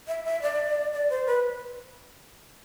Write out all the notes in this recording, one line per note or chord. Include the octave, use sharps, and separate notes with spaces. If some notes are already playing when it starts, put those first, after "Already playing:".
E5
E5
D5
D5
C5
B4